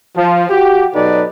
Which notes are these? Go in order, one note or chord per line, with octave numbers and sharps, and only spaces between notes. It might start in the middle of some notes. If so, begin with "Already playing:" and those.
F3
F#4 G4
B2 F#3 D#4 A4 B4 D5